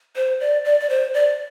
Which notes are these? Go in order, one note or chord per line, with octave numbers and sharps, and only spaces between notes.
C5
D5
D5
D5
C5
D5